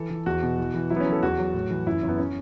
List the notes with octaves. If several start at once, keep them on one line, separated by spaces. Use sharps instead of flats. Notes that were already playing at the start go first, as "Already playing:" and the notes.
Already playing: E3 A4
E3
E2 F#4
B2
E3
E3
F#3 E4
B3
C#4
F#3
A4
E2 F#4
F#3
A2
E3
F#2 E4
F#2
B3
C#4